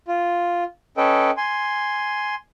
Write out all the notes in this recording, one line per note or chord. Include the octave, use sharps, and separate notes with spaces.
F4
C#4 A4 B4 D#5 G5
G#5 C6